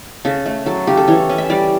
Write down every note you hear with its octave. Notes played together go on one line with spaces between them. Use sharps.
C#3 A4
A3
F#3 A4
C#3 G4
A4
E3 C#5
C#4
E5
G3 D5